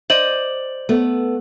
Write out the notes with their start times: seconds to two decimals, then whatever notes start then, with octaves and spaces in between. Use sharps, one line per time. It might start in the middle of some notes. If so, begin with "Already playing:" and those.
0.10 C5 D5 D#5 F#7
0.89 A3 B3